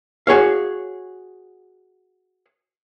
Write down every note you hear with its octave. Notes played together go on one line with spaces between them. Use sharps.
F#4 G#4 C#5 F5